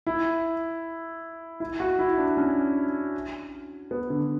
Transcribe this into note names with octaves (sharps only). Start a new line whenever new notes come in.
E4
E4
F#4
E4
D4
C#4
B3
D3